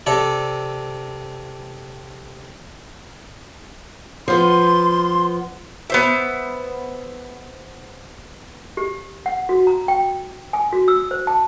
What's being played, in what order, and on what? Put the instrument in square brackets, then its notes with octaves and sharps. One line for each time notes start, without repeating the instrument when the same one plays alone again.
[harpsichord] C3 A4 D5
[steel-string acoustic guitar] F3 B3 [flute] C6
[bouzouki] B3 C5 E5
[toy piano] G4
F#5
F#4
A#5
G5
G#5
F#4
E6
C5
A5